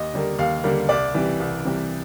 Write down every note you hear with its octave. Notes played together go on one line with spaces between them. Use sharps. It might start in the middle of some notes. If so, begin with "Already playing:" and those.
Already playing: D#2 D#5
D3 G3 A#3
D#2 F5
D3 G3 A#3
C2 D5
C3 E3 G3
C2
C3 E3 G3